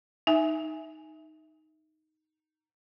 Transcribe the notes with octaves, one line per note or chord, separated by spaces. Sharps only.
D#4 E5 G#5